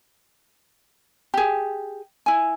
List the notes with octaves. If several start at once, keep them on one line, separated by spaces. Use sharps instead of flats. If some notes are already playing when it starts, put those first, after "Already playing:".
G4 G#4
E4 G#5